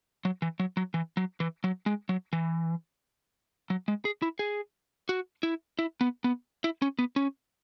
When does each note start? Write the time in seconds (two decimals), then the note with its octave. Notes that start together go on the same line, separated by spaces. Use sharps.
0.25 F#3
0.42 E3
0.60 F#3
0.77 F#3
0.94 E3
1.17 F#3
1.40 E3
1.64 F#3
1.86 G#3
2.09 F#3
2.33 E3
3.70 F#3
3.88 G#3
4.05 G#4
4.22 E4
4.39 G#4
5.09 F#4
5.43 E4
5.79 E4
6.01 B3
6.24 B3
6.64 E4
6.82 C#4
6.99 B3
7.16 C#4